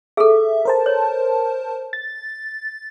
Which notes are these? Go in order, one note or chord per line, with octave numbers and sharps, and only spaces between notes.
G#4 A4 E5
A#4 C5 A5
C#5
A6